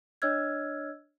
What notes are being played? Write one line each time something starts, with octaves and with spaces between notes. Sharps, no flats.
D4 C#5 D#5 E6 F6 G#6